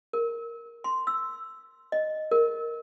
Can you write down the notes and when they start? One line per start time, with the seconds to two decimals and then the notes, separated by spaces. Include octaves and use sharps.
0.13 A#4
0.84 C6
1.07 E6
1.92 D#5
2.31 A#4